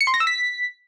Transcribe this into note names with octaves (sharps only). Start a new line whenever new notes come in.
C#7
C6
A#6
E6
B6